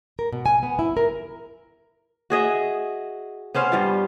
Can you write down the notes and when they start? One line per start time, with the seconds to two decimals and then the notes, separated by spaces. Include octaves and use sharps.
0.19 A#4
0.33 B2
0.46 G#5
0.63 B3
0.79 E4
0.97 A#4
2.30 F#4 G#4 D#5 E5
3.55 B3 C#4 C5 F5
3.72 G2 G3 F4